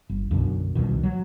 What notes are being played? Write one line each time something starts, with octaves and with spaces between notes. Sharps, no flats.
G1
B1 F#2 D3
C2 G#2 B2 D#3
F#3